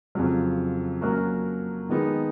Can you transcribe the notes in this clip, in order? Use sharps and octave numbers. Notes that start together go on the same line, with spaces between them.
F2 C#3 F#3
F#3 A#3 C#4 F#4 A#4
D#3 G#3 B3 D#4